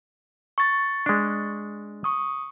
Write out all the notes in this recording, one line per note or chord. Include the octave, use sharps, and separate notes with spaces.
C#6 A6
G#3 D4
C#6 D#6